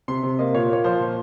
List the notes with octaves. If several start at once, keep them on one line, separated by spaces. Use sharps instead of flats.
C3 C6
C3
A#3 D#5
A#2 C#5
A#3 C#5
F3 C5
A#2